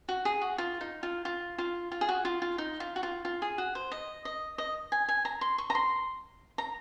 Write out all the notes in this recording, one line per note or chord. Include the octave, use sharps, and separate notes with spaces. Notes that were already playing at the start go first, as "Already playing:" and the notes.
F#4
G#4
F#4
F4
D#4
F4
F4
F4
F4
G#4
F#4
F4
F4
D#4
F4
F#4
F4
F4
G#4
F#4
C5
D#5
D#5
D#5
G#5
G#5
A#5
C6
C#6
A#5
C6
A#5